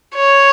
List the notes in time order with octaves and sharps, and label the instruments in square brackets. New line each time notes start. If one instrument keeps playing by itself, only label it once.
[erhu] C#5